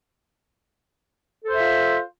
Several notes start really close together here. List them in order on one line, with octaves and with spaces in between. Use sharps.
A4 C5 E5 F4